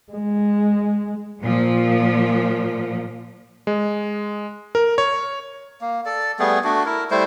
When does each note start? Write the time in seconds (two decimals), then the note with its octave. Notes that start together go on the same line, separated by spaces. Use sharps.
0.13 G#3
1.41 A#2 F3
3.67 G#3
4.75 A#4
4.98 C#5
5.81 A#3
6.06 A4 D5
6.39 G3 A3 B3 G#4
6.64 A3 D4 F#4
6.86 E4 A#4
7.11 G3 A3 E4 C5